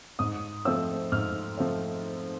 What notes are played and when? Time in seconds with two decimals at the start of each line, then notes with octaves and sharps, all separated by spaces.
0.19 G#2 D#6
0.65 F3 A3 C4 E6
1.12 G#2 F6
1.58 F3 A3 C4